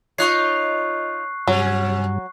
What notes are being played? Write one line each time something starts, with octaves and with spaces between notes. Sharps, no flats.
D#4 F4 C#5 C#6 F#6 C7
G2 C3 F#3 C#4